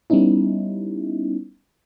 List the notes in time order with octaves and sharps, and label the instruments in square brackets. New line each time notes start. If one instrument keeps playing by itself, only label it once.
[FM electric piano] G3 B3 C#4 D#4 E4